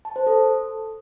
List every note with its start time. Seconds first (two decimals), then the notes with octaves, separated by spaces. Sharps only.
0.05 A5
0.16 C5
0.27 A4